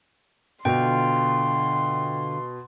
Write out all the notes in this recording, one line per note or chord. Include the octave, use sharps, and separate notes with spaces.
B2 D3 F4 G5 C6